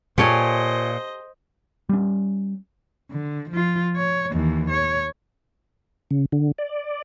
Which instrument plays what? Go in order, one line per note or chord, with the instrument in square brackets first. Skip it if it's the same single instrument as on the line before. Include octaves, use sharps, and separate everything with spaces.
[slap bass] A#2 [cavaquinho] F4 C#5 G#5 [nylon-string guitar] G4 A4 [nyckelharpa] C5 D#5
[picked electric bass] G3 C#4
[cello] D3
F3 F4
C#5
D#2 E3
C#5
[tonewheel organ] C#3
D3
D5